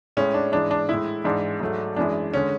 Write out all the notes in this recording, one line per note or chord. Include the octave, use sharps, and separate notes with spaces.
A2 G#3 C#4
D4
G#2 E3 G#3 D4
D4
A2 G#3 E4
G#2 E3 G#3 D4
G#2 F#3 A3
F#2 E3 G#3 D4
D3 G#3 C#4